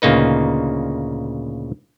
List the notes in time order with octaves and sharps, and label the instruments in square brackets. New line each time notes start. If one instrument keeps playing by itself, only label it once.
[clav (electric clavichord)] D2 A#2 C#3 A#3 D#4 B4